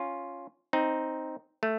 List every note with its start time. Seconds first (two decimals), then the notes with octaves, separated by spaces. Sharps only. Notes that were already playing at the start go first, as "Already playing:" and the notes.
Already playing: C#4 F4
0.73 C4 D#4
1.63 A3